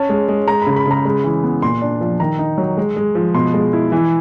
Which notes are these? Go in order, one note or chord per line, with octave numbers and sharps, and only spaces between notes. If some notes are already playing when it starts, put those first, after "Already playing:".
Already playing: C#4 A5
G#3
G#3
G#3 A#5
C#3 B5
B5
C#3 A#5
G#3 B5
E3
B3
A#2 C6
D4
F3
D#3 A#5
D#4
F#3
G#3
G#3
F3
B2 C6
G#3
E4
E3